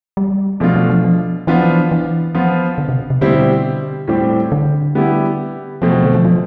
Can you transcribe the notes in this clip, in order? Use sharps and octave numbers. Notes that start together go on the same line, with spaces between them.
G3
B2 F3 A3 D4 F4
F3
F3
F3
E3 F3 B3 D4 F4
E3
F3 B3 F4
D3
C3
C3
B2 D3 G3 C4 E4 G4
A2 G3 C4 G4
D3
G3 B3 E4 G4
B2 F3 A3 C4
F3
D3
F3
F3